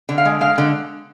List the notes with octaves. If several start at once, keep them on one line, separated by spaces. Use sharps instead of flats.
D3
F5
G#3
G#3 F5
D3